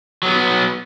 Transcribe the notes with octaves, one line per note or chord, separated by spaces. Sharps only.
F#3 B3